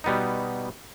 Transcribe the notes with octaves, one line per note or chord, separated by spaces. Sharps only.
B2 G3 B3 D#4